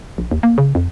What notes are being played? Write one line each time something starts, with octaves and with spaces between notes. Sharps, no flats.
A#1
D#2
A#3
C#3
F2